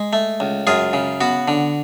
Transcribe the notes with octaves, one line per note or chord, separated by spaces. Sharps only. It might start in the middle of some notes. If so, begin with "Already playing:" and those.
Already playing: G#3
A3
C#2
F#2 F4 G#4
C#3
B3 F#4
D3